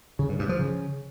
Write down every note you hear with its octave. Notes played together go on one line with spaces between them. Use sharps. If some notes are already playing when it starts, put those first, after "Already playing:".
C#3
G2
G2
F3
C#3